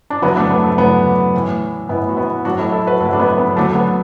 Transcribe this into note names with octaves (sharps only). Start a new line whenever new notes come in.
D4
E2 D3 F#3 B3 E4
A3 D4
B3
A3
E2 D3 F#3 B3
A2 E3
A2 E3 B3 E4
F#4
B3 E4
A2 F#3 D4 F#4
E4 A4
E4 A4
F#4 B4
A2 F#3 E4 A4
D4
B3 E4
B3
D2 D3 F#3 A3 D4
B3